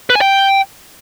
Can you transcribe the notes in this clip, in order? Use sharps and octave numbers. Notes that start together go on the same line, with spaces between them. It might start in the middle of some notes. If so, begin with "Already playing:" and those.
B4
G#5
G5